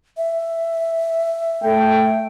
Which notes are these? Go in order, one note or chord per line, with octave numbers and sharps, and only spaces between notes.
E5
A3 G5